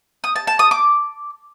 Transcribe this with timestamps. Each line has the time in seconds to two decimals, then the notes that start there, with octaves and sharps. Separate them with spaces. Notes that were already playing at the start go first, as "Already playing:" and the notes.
0.24 D#6
0.36 A5
0.47 A5
0.59 D#6
0.71 D6